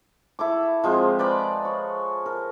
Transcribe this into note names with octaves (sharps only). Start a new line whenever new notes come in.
E4 A4 D6
F3 G#3 C4
B4 D5 A#5 B5
C#5
A#4